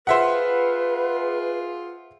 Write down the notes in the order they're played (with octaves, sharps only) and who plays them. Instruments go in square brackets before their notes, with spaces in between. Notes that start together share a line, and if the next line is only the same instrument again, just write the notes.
[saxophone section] F4 G#4 [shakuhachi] B4 [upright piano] C5 E5 F#5